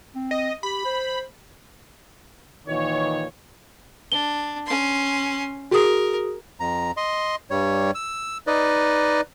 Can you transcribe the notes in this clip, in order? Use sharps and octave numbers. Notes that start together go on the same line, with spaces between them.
C4
D#5
G4 B5
C5
A#2 D#3 E3 C#5
D4 G7
C#4 C6
F#4 G#4 A#4 D#6
F2 A#5
D#5 C6
G2 G3 C#5
E6
D#4 B4 D5 D#5